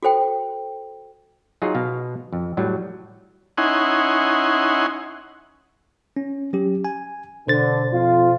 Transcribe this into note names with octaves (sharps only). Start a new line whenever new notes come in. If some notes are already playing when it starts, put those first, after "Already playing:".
F#4 A4 C5 G5
F#3 D#4 F4 G#4 C#5
B2 F5
F2
A2 F#3 G3
C#4 D#4 E4 F#5 G#5 C6
C#4
F#3 C#4 G4
G#5
B2 D3 C5 A6
F2 F4